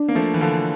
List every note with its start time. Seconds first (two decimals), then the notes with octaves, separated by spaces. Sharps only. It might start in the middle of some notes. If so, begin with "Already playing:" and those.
Already playing: D4
0.08 A#3
0.15 F3 A3
0.34 E3
0.41 D3 F3